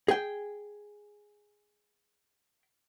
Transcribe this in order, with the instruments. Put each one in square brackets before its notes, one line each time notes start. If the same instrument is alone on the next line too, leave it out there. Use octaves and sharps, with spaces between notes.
[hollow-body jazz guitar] G#4 G5